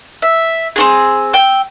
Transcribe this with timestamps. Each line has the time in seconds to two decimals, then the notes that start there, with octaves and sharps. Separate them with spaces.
0.22 E5
0.76 C4 C#4 G#4
1.34 G5 E6